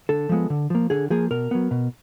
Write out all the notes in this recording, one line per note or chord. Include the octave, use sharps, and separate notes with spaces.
D3 A4
F3 G#3 B3
D3
F3 A#3
D3 G#4
F3 A#3 G#4
B2 A#4
F#3 B3
B2